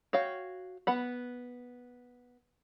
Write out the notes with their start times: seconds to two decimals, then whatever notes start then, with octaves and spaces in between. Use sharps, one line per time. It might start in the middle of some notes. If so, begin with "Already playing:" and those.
0.13 F#4 C#5 F5 G5
0.87 B3 F#5 B5